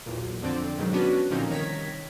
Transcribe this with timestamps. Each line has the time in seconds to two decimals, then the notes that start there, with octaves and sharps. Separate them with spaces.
0.06 B1 E2 A#2
0.42 F2 D3 C4 D5
0.77 F2 G#2 B2 D#3 F#3
0.93 B3 C#4 D4 F#4 B4
1.31 A#2 D3 F3 C4 C#4 D#4
1.50 C2 D#3 C#5 A#5 G#6 B6